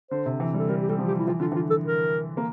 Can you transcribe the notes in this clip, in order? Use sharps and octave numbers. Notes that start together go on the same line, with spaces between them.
D3 C5
C3
E3
G3 A4
G3 A#4
G4
G3 A4
F3
G4
E4
E3 F4
D3 F4
E3 F4
A4
A#4
A#3